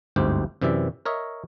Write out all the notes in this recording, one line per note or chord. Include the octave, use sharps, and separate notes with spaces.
G1 D2 G#2 C4 G4
F#2 C3 E3 D5 E5
A#4 C#5 D#5 E5